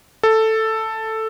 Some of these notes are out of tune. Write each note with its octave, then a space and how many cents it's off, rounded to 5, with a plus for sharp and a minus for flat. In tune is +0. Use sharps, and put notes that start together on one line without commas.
A4 +5